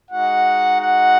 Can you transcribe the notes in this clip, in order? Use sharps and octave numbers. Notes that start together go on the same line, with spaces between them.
G#3 D#4 F#4 F#5
F#5